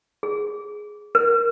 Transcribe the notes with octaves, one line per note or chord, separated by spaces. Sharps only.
G#4
A#4